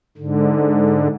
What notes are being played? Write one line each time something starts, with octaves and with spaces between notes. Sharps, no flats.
G#2 D3